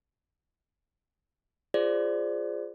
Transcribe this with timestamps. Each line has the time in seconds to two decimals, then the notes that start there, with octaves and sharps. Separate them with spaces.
1.74 F4 G#4 C5 D5